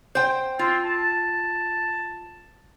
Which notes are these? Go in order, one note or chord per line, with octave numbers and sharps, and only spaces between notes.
C5 G5
C4 F4
A5